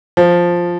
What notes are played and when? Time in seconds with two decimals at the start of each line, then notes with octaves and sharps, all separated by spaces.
0.17 F3